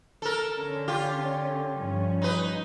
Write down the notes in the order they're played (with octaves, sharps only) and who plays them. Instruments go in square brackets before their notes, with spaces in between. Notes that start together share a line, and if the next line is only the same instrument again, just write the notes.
[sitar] A4 A#4
[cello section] D3 C#4
[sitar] F4 G4
[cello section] G2 F3 C#4
[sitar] D#4 B4